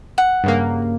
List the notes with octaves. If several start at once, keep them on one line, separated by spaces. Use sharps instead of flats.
F#5
G2 C#3 A#3